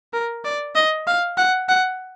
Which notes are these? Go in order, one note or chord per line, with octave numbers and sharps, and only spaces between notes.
A#4
D5
D#5
F5
F#5
F#5